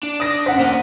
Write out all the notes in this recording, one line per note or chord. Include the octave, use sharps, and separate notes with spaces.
D4
D#6 A#6
F#2 C5 F#5 B6
A#3 D#5